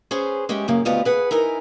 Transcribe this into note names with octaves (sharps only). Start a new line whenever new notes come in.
C#4 G#4 B4 C5
G#3 C#4 G4 E5
F#2 C#3 A#3
D2 B2 B3 F4 G4 D#5
G#4 B4 F#5
D#4 E4 A#4 G#5